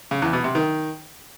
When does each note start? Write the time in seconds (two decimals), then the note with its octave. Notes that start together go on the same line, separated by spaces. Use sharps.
0.11 C#3
0.22 E2
0.33 B2
0.44 C3
0.55 D#3